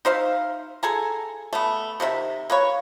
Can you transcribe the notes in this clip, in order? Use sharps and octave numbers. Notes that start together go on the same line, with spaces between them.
D#4 C5 E5 F5
G#4 A4 G#5 A#5
A3 B3
C3 D#3 F4 E5
A#3 B4 C#5